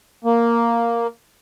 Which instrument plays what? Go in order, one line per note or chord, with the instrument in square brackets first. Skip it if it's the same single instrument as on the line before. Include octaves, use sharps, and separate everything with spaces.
[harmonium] A#3